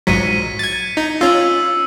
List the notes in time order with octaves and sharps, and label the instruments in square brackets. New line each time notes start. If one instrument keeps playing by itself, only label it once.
[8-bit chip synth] A#1 G#2 F#3 [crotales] B6 C#7 D#7
[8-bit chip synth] G#6 A6
D#4
[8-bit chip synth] C#4 F4 [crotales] E6